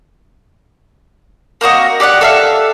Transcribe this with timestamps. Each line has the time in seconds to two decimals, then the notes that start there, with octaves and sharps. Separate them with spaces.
1.61 A#3 C4 F#4 D#5
2.00 G4 D5 F5 F#5
2.21 A4 E5 F5